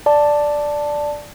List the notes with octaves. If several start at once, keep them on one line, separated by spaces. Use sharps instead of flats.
D5 A5